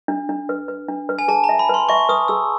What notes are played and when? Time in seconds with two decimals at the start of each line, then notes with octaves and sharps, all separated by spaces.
0.08 D4
0.29 D4
0.49 B4
0.68 B4
0.88 D4
1.09 B4
1.19 G#5
1.28 G#4 A5
1.44 A#5
1.49 E5
1.59 B5
1.69 B4 C6
1.89 E5 C#6
2.09 B4 D#6
2.28 G#4 E6